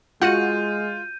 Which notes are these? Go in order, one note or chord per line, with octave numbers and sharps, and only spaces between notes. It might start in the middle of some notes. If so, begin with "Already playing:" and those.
G#3 F4 F#4 F#5 G6 D#7